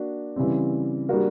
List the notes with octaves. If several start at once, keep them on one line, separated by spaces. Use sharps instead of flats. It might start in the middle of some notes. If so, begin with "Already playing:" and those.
Already playing: A#3 D4 F#4
C#3 E3 G3 C4
G3 A#3 D4 F#4 A#4